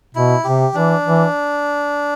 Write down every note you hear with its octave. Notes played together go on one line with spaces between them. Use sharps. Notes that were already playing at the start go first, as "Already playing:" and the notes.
B2 E4
C3 G4
E3 D4
E3